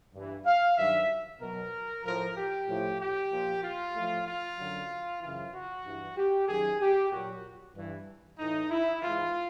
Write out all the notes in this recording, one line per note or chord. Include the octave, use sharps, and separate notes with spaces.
G2 E3
F5
G2 D#3 F#3 E5
B2 F#3 A#4
A2 F3 A#4
G4
A2 F3
G4
A#2 F3
F4
A2 F3
F4
F#2 D3 F#3
F#2 C#3 E3 F4
F#4
G2 E3
G4
F#2 D#3 F#3 G#4
G4
A#2 F#3 F#4
G2 E3
A2 E3 D#4
E4
G#2 E3 F4